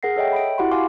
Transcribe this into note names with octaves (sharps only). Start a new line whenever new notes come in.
G#4 A#4 F#5 A#6 C7
A4 C#5 D#5 E5 G5
B5 D7
E4 F#4 G4 F#5 B5 C6
F5 G#5 C6 D6